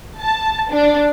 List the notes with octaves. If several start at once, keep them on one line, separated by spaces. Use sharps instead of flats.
A5
D4